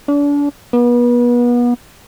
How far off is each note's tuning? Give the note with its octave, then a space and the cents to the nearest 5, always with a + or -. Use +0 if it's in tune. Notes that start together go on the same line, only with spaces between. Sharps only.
D4 -35
B3 -35